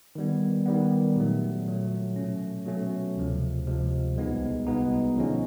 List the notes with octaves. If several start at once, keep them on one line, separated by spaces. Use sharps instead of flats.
D#3 G3 B3
D#3 G3 B3
A#2 F#3 A3
A#2 F#3 A3
B2 F#3 A3 C#4
B2 F#3 A3 C#4
D2 C3 F3 G#3
D2 C3 F3 G#3
C2 B2 G#3 B3 D#4
C2 B2 G#3 B3 D#4
D3 F3 G#3 C#4